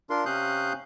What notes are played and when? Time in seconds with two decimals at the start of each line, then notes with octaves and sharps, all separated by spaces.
0.10 D4 F4 A#4 C6
0.26 C3 C#4 F5 D#6 F#6 G6